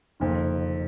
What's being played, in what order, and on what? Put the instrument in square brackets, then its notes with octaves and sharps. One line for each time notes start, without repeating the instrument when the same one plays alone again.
[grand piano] F#1 F2 C3 D#3